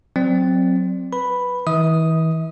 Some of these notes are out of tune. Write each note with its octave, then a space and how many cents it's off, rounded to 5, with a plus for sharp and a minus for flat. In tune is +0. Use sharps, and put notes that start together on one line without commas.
F#3 -10 C4 +0 D5 +0
B4 +0 B5 +0
E3 -40 E5 -40 D#6 +0